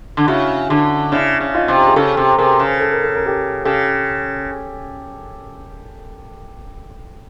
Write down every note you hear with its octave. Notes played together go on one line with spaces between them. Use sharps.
D3
C#3 E4 F#4
D3
C#3 D4 E4
C#3
D#4 F4
C3
G#4
C#3 G4 A4
C3
C3 G#4 A#4
C#3
A4
A#4
A4
A#4
G4 A4
C#3 G4 A4